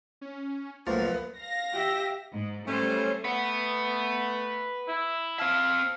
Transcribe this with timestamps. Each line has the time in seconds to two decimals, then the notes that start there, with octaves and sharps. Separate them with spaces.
0.21 C#4
0.87 C#2 F#2 F3 A3 A#3 F4 B4
1.40 F5 A#6
1.73 G4 E5
2.33 G#2
2.67 G3 A3 C#4 C5
3.24 A3 B4 F#5
4.88 E4
5.39 C4 F5 A5